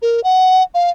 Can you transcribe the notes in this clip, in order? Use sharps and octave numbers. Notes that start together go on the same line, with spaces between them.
A#4
F#5
F5